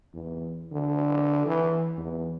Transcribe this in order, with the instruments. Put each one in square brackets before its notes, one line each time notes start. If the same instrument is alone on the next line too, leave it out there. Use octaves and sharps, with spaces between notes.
[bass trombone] E2
D3
E3
E2